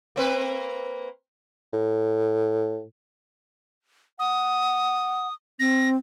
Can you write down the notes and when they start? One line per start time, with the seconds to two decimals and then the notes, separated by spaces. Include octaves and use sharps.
0.16 A#3 C4 B4
1.73 A2
4.19 F#5 D#6
5.60 C4 A#6